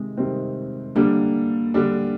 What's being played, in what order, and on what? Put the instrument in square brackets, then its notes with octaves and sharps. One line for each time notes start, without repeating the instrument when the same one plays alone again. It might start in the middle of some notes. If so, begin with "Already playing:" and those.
Already playing: [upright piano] C3 D#3 [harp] G#3
[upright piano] C3 D#3 G3 C4
[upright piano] D3 G3 D4 [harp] A#3
[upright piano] D3 G3 D4